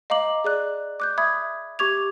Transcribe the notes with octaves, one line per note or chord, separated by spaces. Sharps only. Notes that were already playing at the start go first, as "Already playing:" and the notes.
D#5 F5 A#5 D6 F#7
G#4 D5 F#6
D6 F#6 G6
E5 B5 D#6 G#6
G4 C#6 D6 G#6 F7